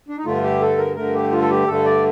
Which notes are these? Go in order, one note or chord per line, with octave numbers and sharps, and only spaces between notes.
D4
D#4
G2 D3 A3 F4
G4
A4
A#4
G2 D3 A3 A#4
G4
F4
A4
G4
G2 D3 A3 A4
D5